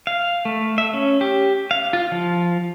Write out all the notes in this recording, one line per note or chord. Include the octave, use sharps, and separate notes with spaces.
F5
A3
E5
C#4
G4
F5
F4
F3